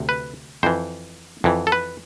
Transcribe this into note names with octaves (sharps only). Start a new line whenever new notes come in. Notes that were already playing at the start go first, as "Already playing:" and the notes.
Already playing: D2 C3
B4
F2 E3 C5
F2 E3
A4
B4